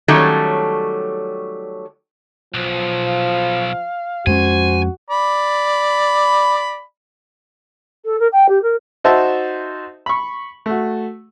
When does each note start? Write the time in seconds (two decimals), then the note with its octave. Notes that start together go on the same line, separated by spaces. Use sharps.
0.08 D#3 F#3 G3 A3 C#4 A4
2.54 B1 F3
3.08 F5
4.27 F2 G#3 C#4 F#4 C5 G#5
5.10 D5 B5
8.05 A4
8.20 A#4
8.32 G5
8.49 G4
8.62 A#4
9.04 D#4 F#4 C5 E5 A5
10.06 B5 C#6
10.66 A3 F#4